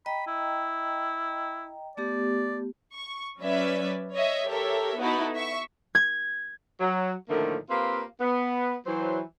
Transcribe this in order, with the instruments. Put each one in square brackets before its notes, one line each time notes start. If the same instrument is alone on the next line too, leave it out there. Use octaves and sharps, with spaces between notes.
[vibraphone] D#5 G5 A#5 [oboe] B5
[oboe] E4
[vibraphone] A3 B3 G4 [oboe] D5
[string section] C#6
F#3 C#4 B4 D5 E5
C#5 D#5 E5
G4 A4 A#4 C#5 E5
B3 D#4 E4 F#4 A4 B4
E5 C#6
[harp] G#6
[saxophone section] F#3
A2 D3 D#3 F3 A3 A#3
A#3 C4 F4 G4 B4 C5
B3
E3 F#3 C5